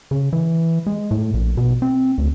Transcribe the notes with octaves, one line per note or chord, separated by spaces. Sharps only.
C#3
E3
G#3
A2
A#1
B2
C4
D2